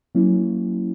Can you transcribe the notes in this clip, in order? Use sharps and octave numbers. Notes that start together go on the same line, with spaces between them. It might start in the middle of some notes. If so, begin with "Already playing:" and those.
F#3 A#3 C#4 E4